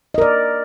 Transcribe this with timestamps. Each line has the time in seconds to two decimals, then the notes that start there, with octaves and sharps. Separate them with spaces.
0.14 D#5
0.18 A#4
0.21 D5